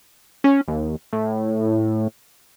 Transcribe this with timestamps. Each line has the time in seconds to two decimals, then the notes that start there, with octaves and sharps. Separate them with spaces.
0.44 C#4
0.68 D#2
1.13 A2